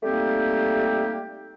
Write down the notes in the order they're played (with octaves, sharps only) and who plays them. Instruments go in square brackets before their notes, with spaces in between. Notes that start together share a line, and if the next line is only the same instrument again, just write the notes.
[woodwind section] G3 A3 A#3 C4 D#4 G4